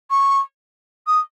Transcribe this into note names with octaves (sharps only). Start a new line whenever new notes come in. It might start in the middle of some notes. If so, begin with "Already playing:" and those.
C#6
D#6